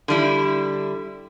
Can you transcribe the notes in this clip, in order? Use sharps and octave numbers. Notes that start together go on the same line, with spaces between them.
D3 G3 E4